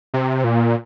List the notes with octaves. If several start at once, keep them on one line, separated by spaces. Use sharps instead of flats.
C3
A#2